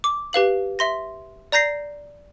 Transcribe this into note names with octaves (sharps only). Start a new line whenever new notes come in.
D6
G4 B4 F5 F#7
E5 C6 A#6
D5 A#5 G6 A#6 C7